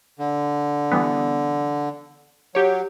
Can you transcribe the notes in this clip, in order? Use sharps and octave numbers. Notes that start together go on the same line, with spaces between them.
D3
E3 G3 B3
F#3 G4 C#5